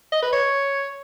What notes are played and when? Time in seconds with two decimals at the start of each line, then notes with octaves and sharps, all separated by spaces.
0.12 D#5
0.22 B4
0.33 C#5